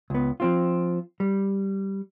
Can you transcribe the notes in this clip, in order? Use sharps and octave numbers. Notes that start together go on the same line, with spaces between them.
C#2 B3
F3 C4 F4
G3